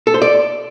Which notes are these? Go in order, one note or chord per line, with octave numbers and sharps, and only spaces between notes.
A4
C5
D5